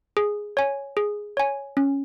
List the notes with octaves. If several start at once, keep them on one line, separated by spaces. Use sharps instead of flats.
G#4
C#5 G#5
G#4
C#5 G#5
C#4